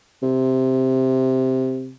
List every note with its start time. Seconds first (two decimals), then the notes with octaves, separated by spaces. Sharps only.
0.22 C3